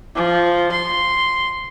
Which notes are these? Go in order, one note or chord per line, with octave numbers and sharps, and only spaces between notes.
F3
C6